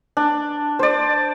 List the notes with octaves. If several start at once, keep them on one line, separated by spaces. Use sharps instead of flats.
D4
C5 D5